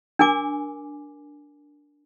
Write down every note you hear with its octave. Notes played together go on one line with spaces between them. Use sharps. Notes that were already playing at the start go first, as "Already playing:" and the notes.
D4 A#4 G#5 D6